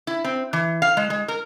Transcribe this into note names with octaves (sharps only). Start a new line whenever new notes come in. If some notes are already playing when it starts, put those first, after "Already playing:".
E4
C4
E3
F5
G#3
G#3
A#4